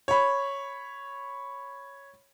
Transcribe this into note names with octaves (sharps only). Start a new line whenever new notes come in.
C#5 B5